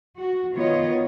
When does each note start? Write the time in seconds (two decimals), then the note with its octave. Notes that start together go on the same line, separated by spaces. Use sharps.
0.18 F#4
0.54 D#3 B3 F4 C#5 D#5